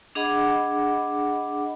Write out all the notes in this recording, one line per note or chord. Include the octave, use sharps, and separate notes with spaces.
D4 G#4 D#5 F#5 B5 D6